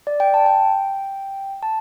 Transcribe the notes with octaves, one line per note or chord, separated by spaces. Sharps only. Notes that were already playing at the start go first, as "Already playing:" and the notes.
D5
G5
A5
G5
A5